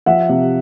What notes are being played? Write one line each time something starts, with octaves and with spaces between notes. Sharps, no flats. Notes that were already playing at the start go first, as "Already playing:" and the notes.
F3 E5 F#5
C3